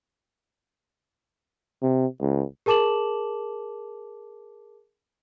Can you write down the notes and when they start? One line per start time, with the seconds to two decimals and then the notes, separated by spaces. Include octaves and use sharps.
1.82 C3
2.21 C#2
2.66 G#4 A#4 A5 D6 E7 F#7